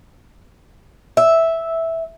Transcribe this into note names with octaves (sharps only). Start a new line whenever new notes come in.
E5